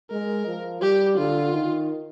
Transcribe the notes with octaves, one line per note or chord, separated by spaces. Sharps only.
G#3 A#4
F3
G3 G4
D3 F4
D#3